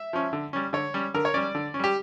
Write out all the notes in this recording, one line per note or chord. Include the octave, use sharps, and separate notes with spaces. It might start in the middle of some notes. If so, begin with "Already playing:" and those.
Already playing: E5
F3 C#4
D3
G3 C#4
D3 C#5
G3 C#4
D3 A#4
C#5
G3 C#4 D5
D3
C#4
G3 G4